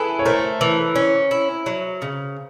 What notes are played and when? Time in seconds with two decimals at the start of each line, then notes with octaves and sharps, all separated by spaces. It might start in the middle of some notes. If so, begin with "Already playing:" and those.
Already playing: E4 G#4 A4 B4
0.19 C#5
0.25 A3 A#4 C5
0.61 E3
0.95 C#4
1.31 E4
1.66 F#3
2.02 C#3